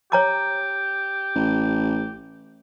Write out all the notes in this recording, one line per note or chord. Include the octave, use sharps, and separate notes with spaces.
G4 C#5 A#5 D6
A1